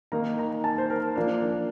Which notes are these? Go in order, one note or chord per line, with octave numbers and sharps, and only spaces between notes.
D#3 A#3 D#4 A#5
A#5
A5
C5
A#4
F3 A#3 D4